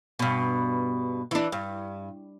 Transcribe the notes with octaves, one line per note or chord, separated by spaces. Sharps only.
G2 B2
E3 D4
G2